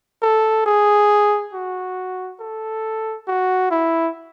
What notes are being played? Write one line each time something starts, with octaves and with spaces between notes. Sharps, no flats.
A4
G#4
F#4
A4
F#4
E4